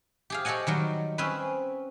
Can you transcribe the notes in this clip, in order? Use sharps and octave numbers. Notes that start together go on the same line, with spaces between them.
G4 G#4 F5
G4 A4 C#5 D#5 F#5 G#5
D#3 F#3 G3
C4 C#4 G#4 B4